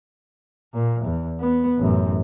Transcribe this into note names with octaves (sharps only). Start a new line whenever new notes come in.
A#2
E2
B3
A1 F#2